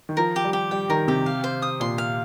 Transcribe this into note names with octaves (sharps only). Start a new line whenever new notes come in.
D#3
F3 A#4
G4
G3
G4
G3 G5
D#3 A#4
C3 G4
F5
C5
D#6
A#2 C6
F5